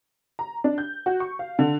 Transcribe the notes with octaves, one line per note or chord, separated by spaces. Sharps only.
A#5
D4
G6
F#4
C#6
F5
D3